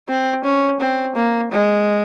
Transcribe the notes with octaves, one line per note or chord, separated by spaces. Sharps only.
C4
C#4
C4
A#3
G#3